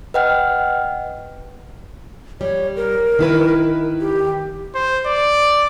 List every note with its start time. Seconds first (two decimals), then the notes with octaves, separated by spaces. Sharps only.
0.14 B4 D#5 F#5 G5 F6
2.41 G3 C#5
2.76 A#4
3.19 D#3 E4 B4
4.01 G4
4.74 C5
5.06 D5